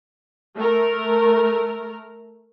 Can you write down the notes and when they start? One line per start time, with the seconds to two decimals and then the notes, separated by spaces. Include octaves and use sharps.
0.55 A3 A#4